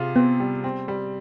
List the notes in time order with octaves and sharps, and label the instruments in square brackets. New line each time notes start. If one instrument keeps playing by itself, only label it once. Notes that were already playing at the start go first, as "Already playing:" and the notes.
Already playing: [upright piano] C3 F4 G#4
[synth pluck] B3 [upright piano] C4
[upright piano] G3
C4
G3